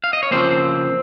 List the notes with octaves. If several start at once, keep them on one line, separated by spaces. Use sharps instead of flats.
F5
D#5
C#5
C#3 F3 A#3 C4 C5